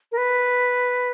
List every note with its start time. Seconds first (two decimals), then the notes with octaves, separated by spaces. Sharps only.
0.12 A#4
0.17 B4